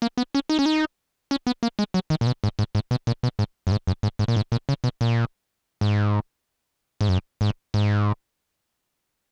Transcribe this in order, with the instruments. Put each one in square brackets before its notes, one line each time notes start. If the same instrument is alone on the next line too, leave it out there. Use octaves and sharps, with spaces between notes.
[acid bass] A#3
B3
C#4
D#4
C#4
D#4
C#4
B3
A#3
G#3
F#3
D#3
A#2
B2
G#2
G#2
G#2
B2
A#2
B2
G#2
F#2
G#2
F#2
G#2
G#2
A#2
G#2
A#2
C#3
B2
A#2
G#2
G#2
F#2
G#2
G#2